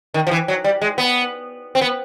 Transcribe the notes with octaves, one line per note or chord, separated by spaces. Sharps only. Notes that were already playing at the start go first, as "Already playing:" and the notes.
D#3
F3
E3
F#3
G3
G#3
B3
C4
B3